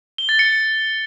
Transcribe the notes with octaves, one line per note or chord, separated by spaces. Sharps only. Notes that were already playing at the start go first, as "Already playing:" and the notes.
G7
A6
C#7